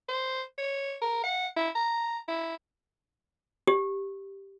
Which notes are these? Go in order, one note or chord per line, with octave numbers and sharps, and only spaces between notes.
C5
C#5
A#4
F#5
E4
A#5
E4
G4